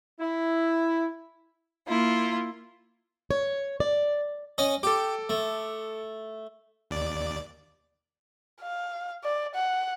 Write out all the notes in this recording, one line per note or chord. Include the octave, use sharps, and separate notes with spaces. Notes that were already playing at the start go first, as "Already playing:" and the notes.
E4
A#3 E4 F4
C#5
D5
C#4 D#5
G4 A4 D6
A3
D#2 D5
F5
D5
F#5